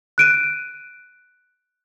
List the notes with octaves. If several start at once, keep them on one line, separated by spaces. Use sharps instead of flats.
F#6 D7 D#7